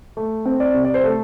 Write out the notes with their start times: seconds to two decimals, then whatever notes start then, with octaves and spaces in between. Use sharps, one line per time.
0.17 A3
0.46 C4
0.60 D5
0.74 C3
0.85 D5
0.94 C5
1.04 A3 A4